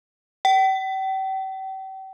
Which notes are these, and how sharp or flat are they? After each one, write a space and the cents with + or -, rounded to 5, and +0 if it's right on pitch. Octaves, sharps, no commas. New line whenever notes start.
G5 -40